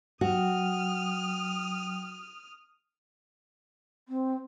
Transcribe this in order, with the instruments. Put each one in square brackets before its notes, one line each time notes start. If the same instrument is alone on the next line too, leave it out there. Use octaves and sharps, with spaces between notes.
[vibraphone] F#3 G5 [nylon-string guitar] F#4 [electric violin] D#6 F6
[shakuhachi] C4